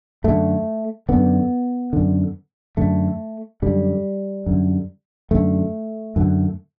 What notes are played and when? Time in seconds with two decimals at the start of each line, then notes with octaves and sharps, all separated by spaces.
0.24 F#2 D3 A3
1.09 F#2 D3 B3
1.93 F#2 D3
2.77 F#2 D3 A3
3.62 F#2 D3 G3
4.46 F#2 D3
5.31 F#2 D3 A3
6.16 F#2 D3